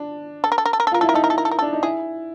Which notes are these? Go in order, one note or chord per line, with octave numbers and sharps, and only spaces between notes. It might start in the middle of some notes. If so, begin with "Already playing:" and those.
Already playing: D4
A4
A#4
A4
A#4
A4
A#4
A4
F4 A#4
E4 A4
A#4
D#4 A4
A#4
A4
A#4
A4
A#4
D4 A4
D#4
E4 G#4